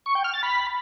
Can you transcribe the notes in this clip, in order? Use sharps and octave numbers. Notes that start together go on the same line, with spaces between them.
C#6
G5
F6
A6
B5